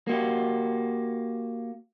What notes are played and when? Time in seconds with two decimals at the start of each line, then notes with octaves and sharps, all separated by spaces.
0.07 A#3 F#4 G4